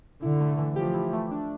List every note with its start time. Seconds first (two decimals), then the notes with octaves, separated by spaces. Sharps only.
0.22 D3 E4
0.40 A3
0.58 E3
0.76 F3 G4
0.94 E4
1.13 A3
1.31 D4